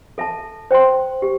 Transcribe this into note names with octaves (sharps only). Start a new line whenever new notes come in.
A4 E5 A5
C5 G5 C6
G4